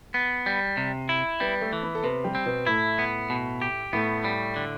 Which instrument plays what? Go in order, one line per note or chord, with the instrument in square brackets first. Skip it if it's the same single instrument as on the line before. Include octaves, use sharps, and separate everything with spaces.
[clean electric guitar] B3
G3
C3
E4
[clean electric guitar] G3 [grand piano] B3 B4
[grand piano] A3 A4
[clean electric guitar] E3
[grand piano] B3 B4
A4
[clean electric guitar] C3 [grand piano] B3 B4
[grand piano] G3 G4
[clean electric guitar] C4
[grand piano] B2 B3
[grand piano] A2 A3 [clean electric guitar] E4
[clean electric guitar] B3
B2
G4
[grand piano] A2 A3 [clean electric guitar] B3
[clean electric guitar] G3
D3